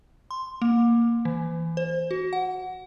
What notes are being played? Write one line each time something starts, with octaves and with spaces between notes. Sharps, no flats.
C6
A#3
E3
C5
F#4
F#5